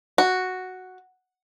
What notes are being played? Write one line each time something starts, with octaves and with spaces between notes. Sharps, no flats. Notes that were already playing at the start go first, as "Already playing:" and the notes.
F#4